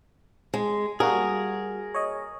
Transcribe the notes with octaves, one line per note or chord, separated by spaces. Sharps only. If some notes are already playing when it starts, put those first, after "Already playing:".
G#3
G3 A#3 F#4 G#4 A#4
C#5 D#5